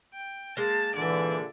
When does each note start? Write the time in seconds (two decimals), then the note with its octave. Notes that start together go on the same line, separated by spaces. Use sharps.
0.14 G5
0.57 G#3 A#3 A5
0.95 A#2 D3 E3 D5 E5